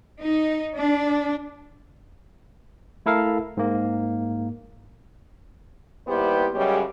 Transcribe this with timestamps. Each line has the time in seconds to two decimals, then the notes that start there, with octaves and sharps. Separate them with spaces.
0.21 D#4
0.76 D4
3.06 A3 E4 A4 A#4 F5
3.57 G#2 A#3
6.07 D#2 G3 B3 E4 G4 C5
6.55 F#2 C#3 G3 G#3 G4 C#5